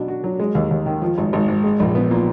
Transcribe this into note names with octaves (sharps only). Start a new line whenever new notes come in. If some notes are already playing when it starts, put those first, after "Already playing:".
Already playing: B2 F#3 D4
F#4
F#3
G#3
D#2
D#2
D#3
F3
G#1
G#1
G#2
G#3
A#1
B3
A#2